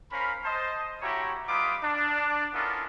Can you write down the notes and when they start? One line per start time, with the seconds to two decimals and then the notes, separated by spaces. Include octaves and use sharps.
0.12 C#4 A#4 C5 F5 B5
0.44 C5 D#5 A5
1.02 A3 E4 F#4 G4 C#5 A#5
1.48 G3 D#4 F4 B4 D6 D#6
1.83 D4
2.54 B3 C#4 E4 F4 A4 A#4